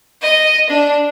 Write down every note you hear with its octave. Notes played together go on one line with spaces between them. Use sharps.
D#5
D4